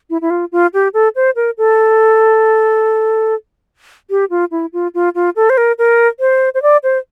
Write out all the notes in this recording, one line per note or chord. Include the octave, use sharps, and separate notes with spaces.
E4
E4
F4
F4
G4
A4
C5
A#4
A4
G4
F4
E4
F4
F4
F4
A4
C5
A#4
A#4
C5
C5
D5
C5